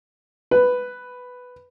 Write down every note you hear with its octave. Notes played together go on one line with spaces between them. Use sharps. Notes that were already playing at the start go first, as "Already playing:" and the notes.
B4